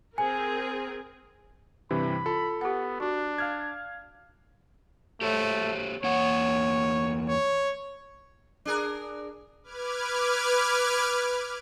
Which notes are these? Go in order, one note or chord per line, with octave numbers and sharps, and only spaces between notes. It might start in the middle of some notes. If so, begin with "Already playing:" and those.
C4 G#4 A#4 G#5
G2 C3 E3 B5
F4 A4
B3 G4 F#5
D4 F#4
F5 F6 G#6
A3 G4 C5 C#5
E2 A#3 C#5 F#5
C#5
D4 G#4 A#4
B4 D6 F6 G#6